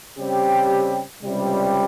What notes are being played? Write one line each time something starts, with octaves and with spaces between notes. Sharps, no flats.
C#3 G3 C4 G4
C#2 C3 G3